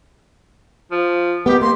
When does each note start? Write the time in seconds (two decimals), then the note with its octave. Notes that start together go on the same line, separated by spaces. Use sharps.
0.92 F3
1.46 D#3 B3 G4
1.61 A#3 C6